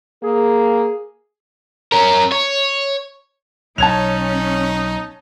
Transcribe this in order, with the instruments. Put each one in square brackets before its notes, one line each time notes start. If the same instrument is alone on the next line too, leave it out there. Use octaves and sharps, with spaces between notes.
[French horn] A#3 [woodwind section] G#4
[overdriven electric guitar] C#4 A#4
C#5
[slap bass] B1 [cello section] C#4 [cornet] D#4 [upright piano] A5 G#6 F7